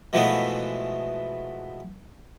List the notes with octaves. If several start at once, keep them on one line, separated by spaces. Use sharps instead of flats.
B2 E3 F3 G#3 A3 B3